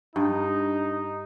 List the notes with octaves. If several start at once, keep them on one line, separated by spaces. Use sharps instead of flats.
G2 D#4